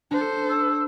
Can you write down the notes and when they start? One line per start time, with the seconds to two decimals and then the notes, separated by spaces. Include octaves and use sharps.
0.11 D4 A4 C5
0.49 E6